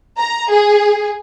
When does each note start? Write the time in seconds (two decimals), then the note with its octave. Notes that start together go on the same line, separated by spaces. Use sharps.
0.17 A#5
0.50 G#4